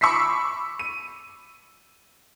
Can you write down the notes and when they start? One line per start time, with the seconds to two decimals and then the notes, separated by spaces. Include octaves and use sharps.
0.01 B5 C#6 D6 E6 B6 C7
0.79 D#7